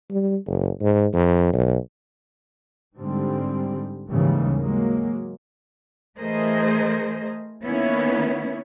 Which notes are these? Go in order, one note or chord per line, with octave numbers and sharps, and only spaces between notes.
G3
F#1
G#2
F2
B1
G#2 D3 G3 C4
D#2 G#2 C#3 E3 G3
F#3 G#3 A#3
E3 A3 G#4 A#4 C5 D#5
D#3 A#3 B3 C#4 E4